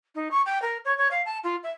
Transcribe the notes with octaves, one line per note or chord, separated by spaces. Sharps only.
D#4
C#6
G5
A#4
C#5
C#5
F5
A5
F4
E5